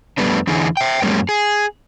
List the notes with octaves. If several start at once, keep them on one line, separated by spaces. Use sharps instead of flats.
F2 G3 A3 B3 D4
E2 D3 E3 D#4 G#4
E5 G5
F#2 G3 G#3 A#3 C#4
G#4